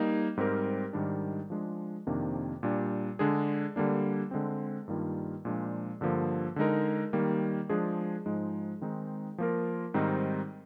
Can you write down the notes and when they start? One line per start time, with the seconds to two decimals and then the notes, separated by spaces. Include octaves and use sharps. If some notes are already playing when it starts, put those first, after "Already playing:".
Already playing: G3 A#3 D#4
0.37 G#2 G3 C4 G4 A#4
0.93 G#2 D#3 G3 D4
1.50 F3 G#3 D4 G#4
2.07 F2 C3 D#3 A#3 D4
2.63 A#2 G3 D4
3.19 D3 G#3 D4 G#4
3.76 D3 G3 A#3 D4
4.31 D3 G#3 C4
4.88 G2 D#3 G3 A#3 F4
5.45 A#2 F3 G#3 D4
6.01 G2 D3 F3 A#3
6.56 D3 G#3 D#4 A#4
7.13 D#3 G3 A#3
7.69 F3 G#3 D4 G#4
8.26 G#2 F3 G#3 D#4
8.82 D#3 G#3 C4 D#4
9.38 F3 A#3 F4 A#4
9.94 G#2 D#3 G3 C4 D#4